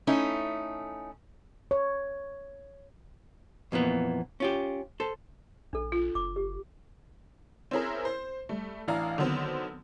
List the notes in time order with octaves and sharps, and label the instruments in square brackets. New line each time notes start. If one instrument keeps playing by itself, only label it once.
[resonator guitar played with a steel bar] A3 C#4 D#4 E4
[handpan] C#5
[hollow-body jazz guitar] F2 A#2 E3 B3
C#4 F4 G4
A4 C5
[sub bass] A#1 [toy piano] D4 A4
[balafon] F4
[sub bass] F#1 [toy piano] D6
[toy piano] G4
[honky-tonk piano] C4 C#4 E4 G#4 A#4
C5
G3 A3
A1 E3 D4 F5 A#5
D3 D#3 F#3 B3 C4